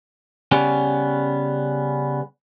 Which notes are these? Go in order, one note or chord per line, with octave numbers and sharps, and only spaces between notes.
C#3 G3 B3 C#4